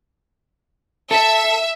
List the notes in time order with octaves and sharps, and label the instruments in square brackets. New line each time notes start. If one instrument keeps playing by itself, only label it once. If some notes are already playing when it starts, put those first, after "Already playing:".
[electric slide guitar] A4 [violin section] E5